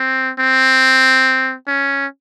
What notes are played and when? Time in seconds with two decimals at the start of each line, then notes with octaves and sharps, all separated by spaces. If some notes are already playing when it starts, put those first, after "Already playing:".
Already playing: C4
0.39 C4
1.68 C#4